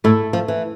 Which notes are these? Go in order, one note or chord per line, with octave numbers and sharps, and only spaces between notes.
A2 A3 E4 A4
F3
E3